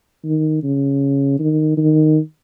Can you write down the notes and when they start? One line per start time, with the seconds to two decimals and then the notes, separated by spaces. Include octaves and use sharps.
0.24 D#3
0.63 C#3
1.39 D#3
1.77 D#3